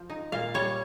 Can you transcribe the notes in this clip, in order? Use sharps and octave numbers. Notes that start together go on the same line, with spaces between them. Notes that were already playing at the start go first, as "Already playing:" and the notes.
Already playing: F3
D#4
A#2 F5
G3 C#5